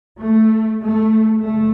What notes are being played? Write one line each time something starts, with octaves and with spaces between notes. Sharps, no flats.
A3
A3
F#1 A3